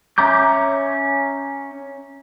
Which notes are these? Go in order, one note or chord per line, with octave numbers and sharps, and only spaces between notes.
C#4 E5 A#5 D6 G6